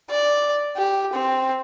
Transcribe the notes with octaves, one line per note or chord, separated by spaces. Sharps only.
D5
G4
C4